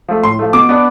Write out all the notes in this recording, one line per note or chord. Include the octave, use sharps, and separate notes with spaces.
F3 A3
A2 C6
F3 A3
B2 D6
B3 D4